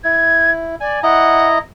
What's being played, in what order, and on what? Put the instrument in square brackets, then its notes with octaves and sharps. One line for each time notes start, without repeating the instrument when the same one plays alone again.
[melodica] E4 [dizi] G#6
[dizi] D5 [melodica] G#5
[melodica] E4 D#5 A#5 [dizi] F#5